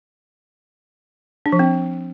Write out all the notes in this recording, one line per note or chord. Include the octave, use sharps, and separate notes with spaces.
D4
F3
C4